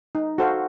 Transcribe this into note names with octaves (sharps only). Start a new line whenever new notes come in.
D#4
F#4 A4 C5 F5